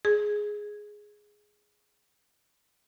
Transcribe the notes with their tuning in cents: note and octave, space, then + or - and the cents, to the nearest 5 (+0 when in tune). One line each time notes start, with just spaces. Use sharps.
G#4 +5